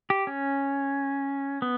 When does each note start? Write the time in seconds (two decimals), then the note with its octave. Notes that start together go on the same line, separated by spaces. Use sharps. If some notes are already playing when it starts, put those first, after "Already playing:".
0.10 G4
0.27 C#4
1.62 B3